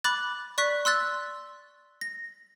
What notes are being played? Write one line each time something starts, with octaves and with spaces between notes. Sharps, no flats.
B5 D6 F#6 A6
D5 C#6 F#6 B6
C6 E6 F#6 A6
A#6